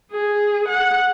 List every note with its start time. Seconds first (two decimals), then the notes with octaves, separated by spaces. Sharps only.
0.12 G#4
0.69 F#5